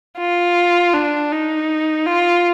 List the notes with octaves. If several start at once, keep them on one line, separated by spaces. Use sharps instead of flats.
F4
D4
D#4
F4